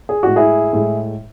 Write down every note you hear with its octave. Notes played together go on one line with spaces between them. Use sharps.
G#4
A2 G#3 F#4
E4 G#4
A2 G#3